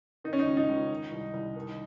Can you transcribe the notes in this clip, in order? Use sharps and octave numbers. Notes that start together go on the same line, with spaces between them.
D#3 D#4
C#4
D#4
C#2
D#4
C#2
D#3
C2
C2
D#3